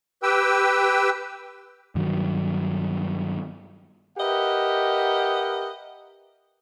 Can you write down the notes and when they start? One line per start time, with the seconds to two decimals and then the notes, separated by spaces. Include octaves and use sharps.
0.23 G4 B4 G5 E6
1.95 G2 D#3 F#3
4.18 G4 A#4 B4 D#5 E5 F#5